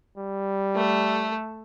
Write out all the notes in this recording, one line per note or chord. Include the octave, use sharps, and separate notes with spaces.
G3
A3 A4